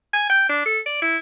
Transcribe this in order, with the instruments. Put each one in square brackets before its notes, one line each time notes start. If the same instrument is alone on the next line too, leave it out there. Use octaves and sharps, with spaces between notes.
[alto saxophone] G#5
G5
D4
A4
D5
E4